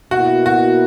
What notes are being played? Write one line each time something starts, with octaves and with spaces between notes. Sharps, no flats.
B2 A#3 E4 F#4
F#4